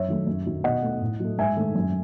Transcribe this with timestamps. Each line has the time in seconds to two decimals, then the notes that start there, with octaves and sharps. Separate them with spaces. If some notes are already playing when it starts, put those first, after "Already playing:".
Already playing: F#2 C#5 E5
0.08 D#3 F#3 A3
0.27 F#2
0.46 D#3 F#3
0.64 B2 D#5 F#5
0.83 A3
1.01 A2
1.20 F#3 A3
1.38 G#2 E5 G#5
1.57 D#3 A3
1.75 F#2